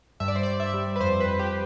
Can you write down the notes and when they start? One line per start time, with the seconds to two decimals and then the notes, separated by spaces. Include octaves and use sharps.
0.20 G2 E5
0.28 D5
0.36 C5
0.43 G2 D5
0.60 E5
0.74 G3
0.96 B4
1.00 F2 C5
1.20 B4
1.26 F2
1.39 G4